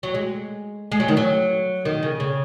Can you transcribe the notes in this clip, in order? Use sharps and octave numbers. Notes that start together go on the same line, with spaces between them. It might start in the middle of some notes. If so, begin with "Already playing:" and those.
F#3
G#3
G#3
F#3
D#3
F#3
D#3
C#3
C#3